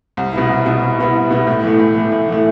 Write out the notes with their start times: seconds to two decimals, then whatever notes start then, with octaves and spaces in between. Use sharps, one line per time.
0.17 C2
0.33 B2 B3 E4
0.49 C2
0.66 B2 B3 E4
0.82 C2
0.99 B2 B3 E4
1.15 C2
1.30 B2 B3 E4
1.47 A2
1.63 E3 A3
1.79 A2
1.95 E3 A3
2.12 A2
2.28 E3 A3